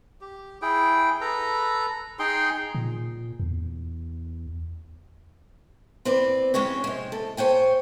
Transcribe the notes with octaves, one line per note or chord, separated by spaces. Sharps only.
G4
E4 G#4 G5
A4 B4 A#5
D#4 G#4 G5 C6
A#2
E2
C4 B4 D5
G#3 C#4 G4 C#5
C3 G#3
A4
C5 C#5 G5 G#5